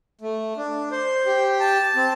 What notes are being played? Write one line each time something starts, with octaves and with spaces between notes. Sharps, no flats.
A3
D4
C5
G4
A5
C4